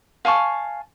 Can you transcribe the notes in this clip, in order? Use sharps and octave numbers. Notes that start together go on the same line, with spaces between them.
F5 G#5 A5 C#6